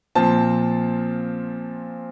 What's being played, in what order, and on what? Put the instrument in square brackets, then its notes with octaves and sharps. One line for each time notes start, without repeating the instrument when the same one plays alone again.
[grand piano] A#2 F3 C4 A5